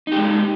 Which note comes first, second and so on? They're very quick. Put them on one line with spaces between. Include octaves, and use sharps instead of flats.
D#4 G4 G#3